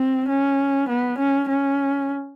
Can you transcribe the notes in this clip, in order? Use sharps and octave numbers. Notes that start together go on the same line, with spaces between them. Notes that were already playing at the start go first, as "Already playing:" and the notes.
Already playing: C4
C#4
B3
C#4
C#4